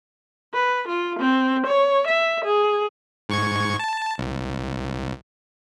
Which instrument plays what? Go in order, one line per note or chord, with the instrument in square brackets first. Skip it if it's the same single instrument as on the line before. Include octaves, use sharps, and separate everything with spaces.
[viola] B4
F4
C4
C#5
E5
G#4
[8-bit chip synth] G#2 C#6 G#6
A5
C2